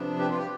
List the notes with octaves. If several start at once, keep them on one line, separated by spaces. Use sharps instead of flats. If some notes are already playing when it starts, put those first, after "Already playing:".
Already playing: C3 F3 B3 D4
G4 B4
F4
G4